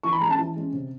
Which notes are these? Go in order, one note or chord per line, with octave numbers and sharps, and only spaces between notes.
E3 C#6
B5
G#3 C#4 A#5
A5
E3
G#3 C#4
C3